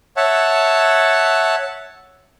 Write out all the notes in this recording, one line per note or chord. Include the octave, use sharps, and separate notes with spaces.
C#5 E5 F#5 A5